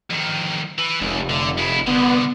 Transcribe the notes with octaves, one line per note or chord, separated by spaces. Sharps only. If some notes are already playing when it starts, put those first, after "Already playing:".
F2 D#3
E3
F1 C#2
D3
G#3 E4
C2 D3 B3